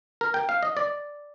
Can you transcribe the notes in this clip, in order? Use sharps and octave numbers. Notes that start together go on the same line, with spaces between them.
A#4
G5
F5
D#5
D5